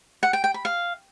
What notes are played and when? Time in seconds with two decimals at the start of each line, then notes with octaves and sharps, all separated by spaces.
0.23 F#5
0.33 G5
0.44 G5
0.54 B5
0.65 F5